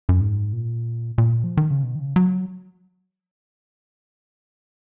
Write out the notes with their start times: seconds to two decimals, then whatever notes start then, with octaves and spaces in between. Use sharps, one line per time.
0.09 F#2
0.21 G#2
0.53 A#2
1.18 A#2
1.44 F3
1.57 D#3
1.70 C#3
1.83 B2
1.95 D#3
2.00 C#3
2.16 F#3